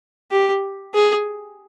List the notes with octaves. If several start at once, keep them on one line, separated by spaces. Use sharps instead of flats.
G4
G#4